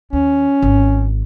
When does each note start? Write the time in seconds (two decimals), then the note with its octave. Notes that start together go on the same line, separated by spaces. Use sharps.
0.13 D#2 C#4
0.62 G#1